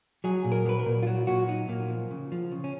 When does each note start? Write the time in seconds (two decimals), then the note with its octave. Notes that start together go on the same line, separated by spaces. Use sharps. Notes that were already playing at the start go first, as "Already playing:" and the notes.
0.24 F#3 G#4
0.44 A#2
0.52 A#4
0.66 F#3 B4
0.79 A#4
0.86 A#2
1.03 F4
1.07 F#3 F#4
1.27 A#2 F#4
1.48 F#3 D#4
1.69 A#2 A#3
1.90 F3
2.11 C#3
2.32 F3
2.52 C#3
2.64 C#4